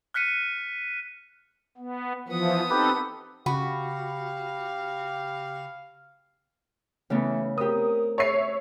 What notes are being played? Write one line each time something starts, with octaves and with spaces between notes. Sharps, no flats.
F6 F#6 B6 C#7 D#7
B3
E3 F3 B3 D#6
C4 D#4 G4 A4 B4
C#3 F#4 G4 F5 B5
C#3 E3 A3 B3
C4 G4 A#4 D#6
C#5 E5 C7